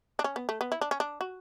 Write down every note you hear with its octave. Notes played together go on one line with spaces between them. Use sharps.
D4
C#4
B3
A3
B3
E4
D4
C#4
D4
F#4